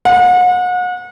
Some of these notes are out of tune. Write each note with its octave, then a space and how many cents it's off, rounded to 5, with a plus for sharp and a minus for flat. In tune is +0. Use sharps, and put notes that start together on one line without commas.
F#5 -35